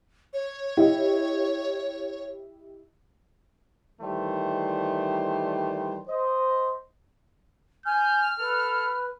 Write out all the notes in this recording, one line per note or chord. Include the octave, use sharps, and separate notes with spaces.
C#5
E4 G4 D#5
D#3 E3 G3 A3 C5
C5 D#5
G#5 F6 G6
A4 B4